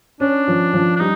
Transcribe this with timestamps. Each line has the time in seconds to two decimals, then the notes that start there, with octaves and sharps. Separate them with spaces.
0.20 C#4 D4
0.48 F3
0.73 F3
0.96 D4
1.00 G3 D#4